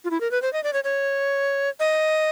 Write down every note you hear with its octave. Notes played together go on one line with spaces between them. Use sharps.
F4
E4
A#4
B4
C5
D#5
D5
C#5
C#5
D#5